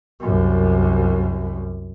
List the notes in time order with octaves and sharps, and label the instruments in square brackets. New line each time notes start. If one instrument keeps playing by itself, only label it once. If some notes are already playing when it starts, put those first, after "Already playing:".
[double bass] C2 F#2